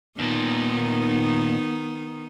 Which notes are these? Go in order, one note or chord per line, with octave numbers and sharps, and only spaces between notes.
D#2 A#2 D#3 B3 D#4